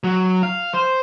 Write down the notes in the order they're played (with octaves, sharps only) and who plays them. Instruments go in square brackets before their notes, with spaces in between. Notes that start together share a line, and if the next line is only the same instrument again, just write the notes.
[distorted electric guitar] F#3
F5
C5